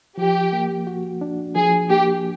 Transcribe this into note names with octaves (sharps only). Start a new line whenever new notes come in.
F3 G4
A#3
F#4
D4
F3 G#4
A#3 G4